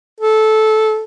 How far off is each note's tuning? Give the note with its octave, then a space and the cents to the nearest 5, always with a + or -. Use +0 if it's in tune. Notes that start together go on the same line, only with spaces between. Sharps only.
A4 -15